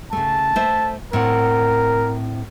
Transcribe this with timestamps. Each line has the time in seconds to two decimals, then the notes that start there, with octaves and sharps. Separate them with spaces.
0.13 C#3 A3 A5
0.56 A3 C5 E5
1.13 A2 C4 A#4 F#5